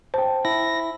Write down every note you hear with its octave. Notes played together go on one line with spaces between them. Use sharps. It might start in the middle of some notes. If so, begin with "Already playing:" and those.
C5 G5 A5
E4 A#6